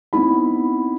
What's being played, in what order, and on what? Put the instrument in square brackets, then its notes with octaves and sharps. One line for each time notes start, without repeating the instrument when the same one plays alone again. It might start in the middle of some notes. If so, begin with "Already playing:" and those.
[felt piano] B3 C4 D#4 E4 B5